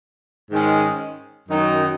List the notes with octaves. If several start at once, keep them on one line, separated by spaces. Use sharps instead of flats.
G#2 D#3 G#3 C#4
F#2 D#3 F#3 D#4